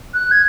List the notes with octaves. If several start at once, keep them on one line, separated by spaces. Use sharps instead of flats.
F#6
G#6